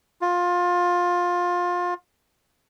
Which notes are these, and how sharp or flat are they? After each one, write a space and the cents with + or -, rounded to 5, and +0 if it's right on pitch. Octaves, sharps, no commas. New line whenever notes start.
F4 +20